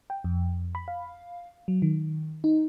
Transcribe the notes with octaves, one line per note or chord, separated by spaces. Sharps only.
G5
F2
B5
F5
F#3
D#3
D#4